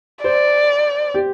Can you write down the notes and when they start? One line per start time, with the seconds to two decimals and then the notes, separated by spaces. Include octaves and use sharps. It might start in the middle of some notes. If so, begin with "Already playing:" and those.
0.24 C5 D5
1.14 G4